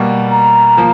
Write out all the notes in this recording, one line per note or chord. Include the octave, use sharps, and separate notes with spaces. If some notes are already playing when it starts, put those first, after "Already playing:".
Already playing: B2 G3 A#3
A#5
F3 A#3